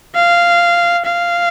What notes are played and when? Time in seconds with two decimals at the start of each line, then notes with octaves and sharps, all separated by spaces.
0.15 F5
1.05 F5